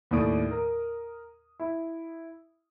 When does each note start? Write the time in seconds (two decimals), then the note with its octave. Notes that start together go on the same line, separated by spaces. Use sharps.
0.11 D#2 A2 D5 C#6 D#6 D7
0.51 A#4
1.60 E4